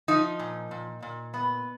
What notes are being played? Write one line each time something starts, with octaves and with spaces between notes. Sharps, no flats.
F3 D#4
A#2
A#2
A#2
B3